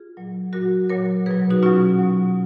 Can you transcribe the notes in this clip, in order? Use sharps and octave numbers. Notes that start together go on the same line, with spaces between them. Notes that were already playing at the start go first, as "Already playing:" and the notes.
Already playing: F4 G#4
A#2 F#3
A#2 F#3 F#4 A#4
A#2 F#3 A#4 C#5
B2 F#3 G#4 B4
D#4 F#4
B2 F#3 C#4 F4
B2 F#3